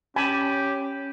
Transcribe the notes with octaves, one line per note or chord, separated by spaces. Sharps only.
C#4 G4 G#5 A5 B5